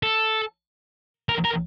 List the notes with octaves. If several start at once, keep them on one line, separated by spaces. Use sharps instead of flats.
A4
A#4
A#4